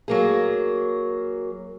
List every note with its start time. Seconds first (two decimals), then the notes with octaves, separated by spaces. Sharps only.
0.08 F#3 A#3 G#4